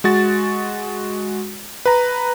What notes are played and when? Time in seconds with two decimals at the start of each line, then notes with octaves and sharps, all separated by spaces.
0.04 G#3 F#4 A6
1.86 B4 A#5